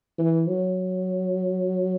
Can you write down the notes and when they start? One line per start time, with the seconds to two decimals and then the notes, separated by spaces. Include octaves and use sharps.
0.18 E3
0.48 F#3